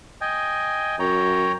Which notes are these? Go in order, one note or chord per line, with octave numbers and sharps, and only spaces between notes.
D#5 G5 G#5
F#2 C#5 G5 A#5